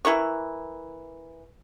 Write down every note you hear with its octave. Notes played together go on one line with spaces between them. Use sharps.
E3 E4 A#4 C#6